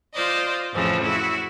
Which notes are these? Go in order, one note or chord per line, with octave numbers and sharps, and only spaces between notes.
F4 C5 D5 D#5
F2 A2 C#3 E3 F3
E4 F#4